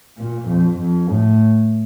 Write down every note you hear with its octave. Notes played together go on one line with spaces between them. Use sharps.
A#2
F2
F2
A2